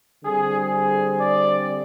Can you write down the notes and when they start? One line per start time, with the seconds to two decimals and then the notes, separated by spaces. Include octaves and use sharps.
0.24 D3 G3 C4 G#4
0.71 G#4
1.18 D5